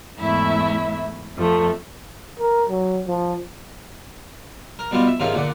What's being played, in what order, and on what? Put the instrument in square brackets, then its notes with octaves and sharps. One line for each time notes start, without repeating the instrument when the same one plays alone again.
[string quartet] E2 G#2 A3 E4 E5
F2 F3 A3
[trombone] A#4
F#3
F3
[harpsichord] A#4
B2 G3 B3 F4
E5
G#2 C3 D#3 F3 C#4 F4
A#2 D3 F#5